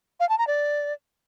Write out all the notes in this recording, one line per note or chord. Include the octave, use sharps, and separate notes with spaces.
F5
A5
A#5
D5